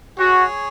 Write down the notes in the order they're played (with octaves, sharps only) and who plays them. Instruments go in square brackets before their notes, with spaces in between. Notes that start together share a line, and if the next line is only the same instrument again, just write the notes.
[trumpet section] F#4 [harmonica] G#4 C#5